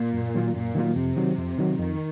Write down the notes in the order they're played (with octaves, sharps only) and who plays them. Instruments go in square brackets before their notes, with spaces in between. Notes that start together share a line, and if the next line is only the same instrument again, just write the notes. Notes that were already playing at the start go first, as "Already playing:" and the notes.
Already playing: [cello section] A#2
[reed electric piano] F#2
D#3 F#3 A#3 F4
[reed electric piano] F#2 [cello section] A#2
[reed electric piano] D#3 F#3 A#3 F4
[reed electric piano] F2 [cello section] C3
[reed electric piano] D#3 F#3
F2
D#3 F#3
[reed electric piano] F2 [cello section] D#3